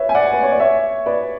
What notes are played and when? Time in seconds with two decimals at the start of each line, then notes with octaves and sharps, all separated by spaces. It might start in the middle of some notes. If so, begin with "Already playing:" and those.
Already playing: B4 C#5 E5
0.09 G#5
0.15 D5 F#5
0.33 B4
0.43 C#5
0.51 D5
0.60 C#5 E5
1.06 B4 D5